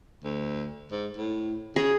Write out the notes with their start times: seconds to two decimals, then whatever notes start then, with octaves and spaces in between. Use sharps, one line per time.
0.24 D2
0.91 G#2
1.17 A2
1.76 C#3 G#4